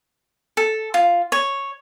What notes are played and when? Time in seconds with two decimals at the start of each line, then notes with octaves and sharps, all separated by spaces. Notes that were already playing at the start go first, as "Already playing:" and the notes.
0.57 A4
0.94 F4
1.32 C#5